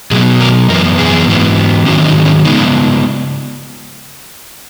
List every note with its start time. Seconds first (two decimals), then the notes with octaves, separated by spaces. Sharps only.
0.11 B2 F#3 B3 G#4
0.40 A#4
0.69 F#2 E3 B3 A#4
0.98 G#4
1.28 G#2 E3 B3
1.86 G#2 D#3 F#3 C#4 F#4
2.06 D#4
2.25 C#4
2.44 C#3 G#3 B3 D#4